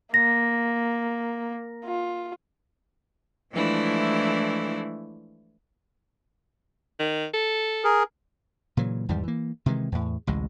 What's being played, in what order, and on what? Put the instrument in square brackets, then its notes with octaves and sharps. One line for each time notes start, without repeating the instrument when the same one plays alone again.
[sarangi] A#3 [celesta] A#6
[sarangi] F4
[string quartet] E3 F3 G#3 A3 D4 E4
[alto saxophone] D#3
A4
[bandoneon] G#4 A#4
[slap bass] A#2 C#3 E3 F#3
E2 G#2 D#3 G3
E3 A#3
C3 D#3 E3 G#3
E2 A2
A1 D2 C3 G#3